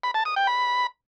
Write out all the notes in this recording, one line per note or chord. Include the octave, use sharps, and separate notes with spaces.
B5
A5
D#6
G5
B5